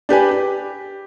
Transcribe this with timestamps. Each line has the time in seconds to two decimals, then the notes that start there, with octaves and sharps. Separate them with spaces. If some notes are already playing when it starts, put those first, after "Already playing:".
0.09 D4 G4 B4 G#5
0.31 G4